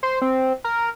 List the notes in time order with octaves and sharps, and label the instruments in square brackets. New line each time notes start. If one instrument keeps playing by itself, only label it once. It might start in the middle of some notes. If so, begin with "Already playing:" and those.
[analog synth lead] C5
C4
A#4